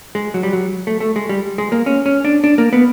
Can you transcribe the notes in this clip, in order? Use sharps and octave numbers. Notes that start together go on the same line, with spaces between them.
G#3
F#3
G3
F#3
A3
A3
G#3
G3
G#3
A#3
C#4
C#4
D4
D4
A#3
B3